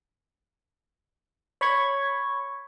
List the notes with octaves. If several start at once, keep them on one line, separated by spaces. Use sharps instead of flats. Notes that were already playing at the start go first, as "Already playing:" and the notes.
C#5 B5 C#6 G#6